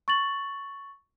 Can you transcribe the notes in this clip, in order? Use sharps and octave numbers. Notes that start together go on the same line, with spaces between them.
C#6 A6 F#7